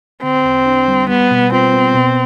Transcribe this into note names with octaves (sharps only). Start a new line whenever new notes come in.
D3 C4
E2
D4
G3
G3 B3
B2
C4 F4
B3
B2